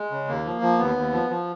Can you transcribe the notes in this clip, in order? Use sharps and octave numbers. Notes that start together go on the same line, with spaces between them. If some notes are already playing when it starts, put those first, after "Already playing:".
Already playing: G#3
C#3
D#2 A#3
F3
F3
D#2 B3
D#2
F3
F3